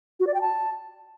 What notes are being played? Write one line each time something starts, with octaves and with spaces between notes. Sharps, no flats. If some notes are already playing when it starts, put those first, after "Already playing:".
F#4
D5
G5
A5